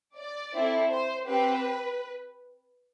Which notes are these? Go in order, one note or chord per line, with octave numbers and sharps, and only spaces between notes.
D5
C4 E4 A4
C5
C4 G4 B4